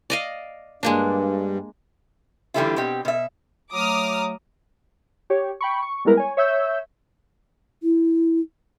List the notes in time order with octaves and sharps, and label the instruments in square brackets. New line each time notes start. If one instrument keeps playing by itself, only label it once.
[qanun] D5 D#5 F5
[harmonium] G2 [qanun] G#3 A#3 D4
[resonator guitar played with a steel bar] D3 E3 G3 A3 E4 F4
B2 C4 G4
B2 E5
[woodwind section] F#3 A3 [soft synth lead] A#5 [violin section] D6 D#6 F6
[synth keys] G4 C#5
G5 B5 C#6
C#6
G3 G#3 B3 E4 A#4 B4
C#5 G#5
C#5 E5 E6 G6
[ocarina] E4